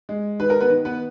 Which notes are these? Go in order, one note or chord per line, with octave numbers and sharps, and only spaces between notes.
G#3
D#3 B4
A#4
B3 B4
D#3
B3 B4